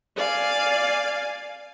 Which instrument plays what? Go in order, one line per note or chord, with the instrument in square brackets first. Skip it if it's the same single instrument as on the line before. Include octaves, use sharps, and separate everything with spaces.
[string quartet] D5 F5 G#5